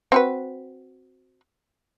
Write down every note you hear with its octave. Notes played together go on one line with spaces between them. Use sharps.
C4 F#4 B4